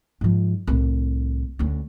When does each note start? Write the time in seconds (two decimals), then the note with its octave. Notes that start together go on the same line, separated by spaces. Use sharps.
0.21 G#2 F3
0.67 C2 A2
1.59 D2 C#4